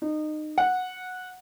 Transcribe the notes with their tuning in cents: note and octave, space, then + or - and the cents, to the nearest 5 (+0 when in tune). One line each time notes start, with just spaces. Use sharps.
D#4 -25
F#5 -10